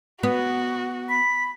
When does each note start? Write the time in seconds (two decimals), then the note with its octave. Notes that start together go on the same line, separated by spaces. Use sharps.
0.23 B3 F#4
1.09 B5 B6